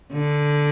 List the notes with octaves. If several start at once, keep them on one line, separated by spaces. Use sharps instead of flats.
D3